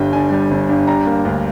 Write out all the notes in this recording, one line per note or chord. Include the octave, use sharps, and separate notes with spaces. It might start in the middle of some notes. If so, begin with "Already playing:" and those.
Already playing: G1 G2 D3 G3 G5
D3 G#5
G3
G1
G2
G3 A#5
A#3
D2